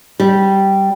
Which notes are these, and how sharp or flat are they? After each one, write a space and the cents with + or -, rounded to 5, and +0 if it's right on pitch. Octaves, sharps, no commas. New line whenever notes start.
G3 -10